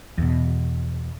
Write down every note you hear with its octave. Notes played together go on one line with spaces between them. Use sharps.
E2 B2